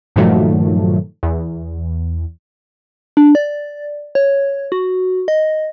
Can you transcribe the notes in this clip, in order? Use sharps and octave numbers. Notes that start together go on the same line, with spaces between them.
G2 A#2 D#3 F3 F#3 A3
E2
D4
D5
C#5
F#4
D#5